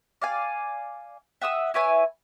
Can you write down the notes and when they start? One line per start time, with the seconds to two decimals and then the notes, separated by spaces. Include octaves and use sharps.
0.22 D5 F5 G#5
1.41 E5 F#5 D#6 E6
1.74 E4 B4 C#5 G#5